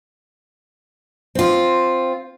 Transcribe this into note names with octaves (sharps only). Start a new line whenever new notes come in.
C4 F4